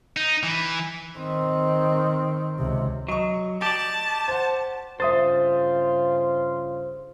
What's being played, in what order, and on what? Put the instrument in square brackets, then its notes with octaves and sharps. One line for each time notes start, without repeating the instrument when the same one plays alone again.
[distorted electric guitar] D#4
E3
[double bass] D#3 C4
C#2 C3
[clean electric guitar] F#3 [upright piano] D#5 C#6
[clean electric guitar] G4 D5 [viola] A5
[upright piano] C5 F#5
[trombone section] G2 C#3 F4 [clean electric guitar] C5 [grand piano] E5 D#6 A6